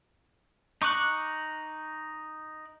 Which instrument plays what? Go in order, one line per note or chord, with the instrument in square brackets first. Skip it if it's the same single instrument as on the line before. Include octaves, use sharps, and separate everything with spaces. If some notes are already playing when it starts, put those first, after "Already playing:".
[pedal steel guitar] D#4 C#6 D6 F#6